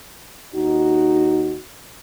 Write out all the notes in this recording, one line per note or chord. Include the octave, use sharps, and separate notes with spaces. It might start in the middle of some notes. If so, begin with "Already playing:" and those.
D#2 D#4 F#4